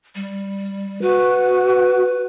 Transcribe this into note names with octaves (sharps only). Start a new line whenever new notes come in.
G3
F#4 B4